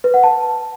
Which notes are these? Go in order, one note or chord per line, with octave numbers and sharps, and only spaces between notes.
B4
F#5
A5